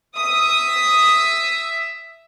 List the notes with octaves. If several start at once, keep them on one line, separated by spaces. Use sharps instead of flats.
E5 D#6